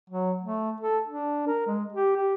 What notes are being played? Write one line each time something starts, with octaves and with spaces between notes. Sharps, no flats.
F#3
A3
A4
D4
A#4
G#3
G4
G4